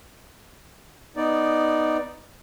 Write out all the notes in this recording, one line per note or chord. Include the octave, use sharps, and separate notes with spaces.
B3 D#4 D5